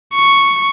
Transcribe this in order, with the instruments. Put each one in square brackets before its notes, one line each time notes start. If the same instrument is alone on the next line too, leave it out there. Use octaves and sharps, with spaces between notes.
[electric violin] C#6